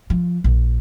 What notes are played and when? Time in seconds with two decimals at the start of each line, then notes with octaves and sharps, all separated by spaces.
0.10 F3
0.44 A#1